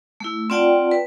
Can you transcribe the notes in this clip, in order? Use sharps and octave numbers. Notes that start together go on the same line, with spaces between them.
A3 E4
C4 F4 D5 F#5 G5 A5
B4